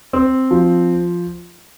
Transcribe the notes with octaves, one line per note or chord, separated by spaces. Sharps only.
C4
F3